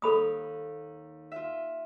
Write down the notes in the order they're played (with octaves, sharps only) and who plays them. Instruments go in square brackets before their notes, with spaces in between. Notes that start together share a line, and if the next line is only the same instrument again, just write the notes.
[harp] D#2 [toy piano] A4 B5 D#6
[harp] F4 E5